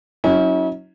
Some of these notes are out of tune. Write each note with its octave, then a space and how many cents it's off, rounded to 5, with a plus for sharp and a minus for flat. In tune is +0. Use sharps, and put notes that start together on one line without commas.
F#3 +0 C#4 +0 E4 -45